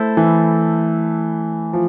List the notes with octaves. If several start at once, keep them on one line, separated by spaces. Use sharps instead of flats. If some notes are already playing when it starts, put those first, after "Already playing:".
Already playing: A3 E4 A4 C5
E3
F3